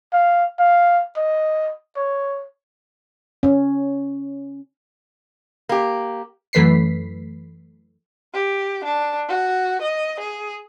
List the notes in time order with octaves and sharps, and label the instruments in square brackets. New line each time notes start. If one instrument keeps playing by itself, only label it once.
[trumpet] F5
F5
D#5
C#5
[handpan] C#4
[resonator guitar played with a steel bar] A#3 G4
[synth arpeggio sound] F#2 E3 A3 B4 B6 C7
[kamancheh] G4
D4
F#4
D#5
G#4